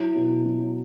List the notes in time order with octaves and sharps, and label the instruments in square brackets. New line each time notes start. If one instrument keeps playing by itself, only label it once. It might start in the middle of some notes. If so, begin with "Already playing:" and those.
Already playing: [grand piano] F#3 [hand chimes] E4
[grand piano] B2
F#3